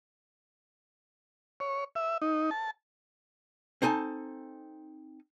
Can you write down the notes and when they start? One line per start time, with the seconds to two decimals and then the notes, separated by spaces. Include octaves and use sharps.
1.60 C#5
1.95 E5
2.22 D#4
2.51 A5
3.82 C4 D#4 A4 G#5 A5